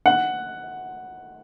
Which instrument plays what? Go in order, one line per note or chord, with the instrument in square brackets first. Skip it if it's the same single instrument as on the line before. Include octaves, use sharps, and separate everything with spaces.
[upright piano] F#5